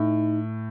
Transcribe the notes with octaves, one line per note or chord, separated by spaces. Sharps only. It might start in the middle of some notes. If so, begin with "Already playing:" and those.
Already playing: A2 D#4